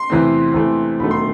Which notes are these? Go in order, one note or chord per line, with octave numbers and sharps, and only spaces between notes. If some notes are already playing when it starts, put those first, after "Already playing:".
Already playing: C6
E2 C3 E3 A3 C4
E2 C3 E3 A3 C4
E1 D#2 D#3 F#3 A3 B5
C6